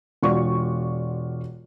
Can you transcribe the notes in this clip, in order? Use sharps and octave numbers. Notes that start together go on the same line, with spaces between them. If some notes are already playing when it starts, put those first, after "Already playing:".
E1 F4 F#4 D5 C#6